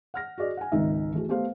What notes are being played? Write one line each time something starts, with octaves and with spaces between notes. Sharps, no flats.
F#5 F6 A#6
F#4 G#4 D5 D#5
F#5 G#5
G#1 C#2 D#3 D#4 E5
E3 A3 F#4 G#4
A3 B3 G4 A4 C5 F5